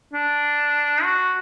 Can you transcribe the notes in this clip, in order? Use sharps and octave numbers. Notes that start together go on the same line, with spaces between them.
D4
F#4